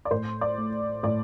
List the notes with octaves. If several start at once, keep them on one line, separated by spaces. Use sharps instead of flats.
D5
A2 C5
D5
A3
A2 D5